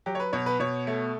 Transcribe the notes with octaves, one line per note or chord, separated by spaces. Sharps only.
F#3 G4
C#5
B4
B2 C#5
B4
B2 C#5
A3